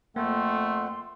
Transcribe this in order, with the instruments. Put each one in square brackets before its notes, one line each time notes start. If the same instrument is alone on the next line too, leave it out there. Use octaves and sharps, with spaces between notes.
[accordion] F2 F#5 G5 [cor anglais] A3 [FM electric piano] A#3 [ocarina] C6